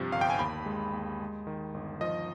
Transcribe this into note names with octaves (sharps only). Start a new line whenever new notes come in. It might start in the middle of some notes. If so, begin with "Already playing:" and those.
Already playing: G2 C3 F3
G1 F5
G5
G#5
D#2 B5
G#3
D#2
G#3
D#3
G1
F3 D#5